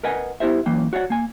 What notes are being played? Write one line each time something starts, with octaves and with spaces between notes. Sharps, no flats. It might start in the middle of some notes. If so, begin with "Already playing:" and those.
A#4 B4 D#5 F#5 G#5
B3 E4 G4 C5 E5
F#2 E3 A#3 G5
F#4 C#5 D5 F5 F#5
A#3 G#5